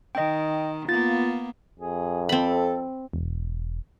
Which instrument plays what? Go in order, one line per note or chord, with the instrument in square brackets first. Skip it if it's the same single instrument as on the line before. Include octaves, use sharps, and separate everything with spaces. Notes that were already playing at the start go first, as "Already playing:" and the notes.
[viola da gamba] D#3 [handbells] D#5 G5
[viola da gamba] A#3 B3 [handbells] F4 A6
[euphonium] F2 [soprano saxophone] G#4
[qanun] C4 B5 [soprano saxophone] A4
[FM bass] E1